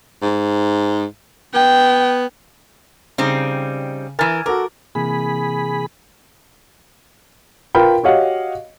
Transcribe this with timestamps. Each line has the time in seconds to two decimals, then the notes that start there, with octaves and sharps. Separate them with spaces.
0.22 G#2
1.54 B3 G5
3.18 C#3 G3 C4 D#4
4.19 E3 A#4 G#5 F6 A6
4.46 F#4 A4 A#4 D6
4.95 C3 E3 A#3 G#4 B5
7.75 F4 A#4 B4 G5 B5
8.03 F#4 G4 C#5 D#5 F5 F#5